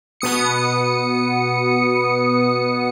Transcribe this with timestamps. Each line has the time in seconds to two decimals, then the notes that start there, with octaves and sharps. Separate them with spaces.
0.21 B2 B3 D#6 C#7